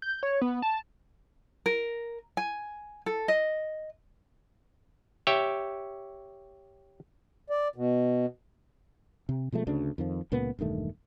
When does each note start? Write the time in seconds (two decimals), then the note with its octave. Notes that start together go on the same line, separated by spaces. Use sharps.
0.02 G6
0.23 C#5
0.41 B3
0.62 A5
1.66 A#4
2.37 G#5
3.06 A4
3.28 D#5
5.27 G4 C#5 E5 G5
7.50 D5
7.76 B2
9.29 C3
9.52 B2 F3 G#3 A3
9.67 D2 C#3 D4
9.98 F2 D#3 F3
10.32 C#2 A#2 A#3 B3
10.59 E1 G2 D#3 A3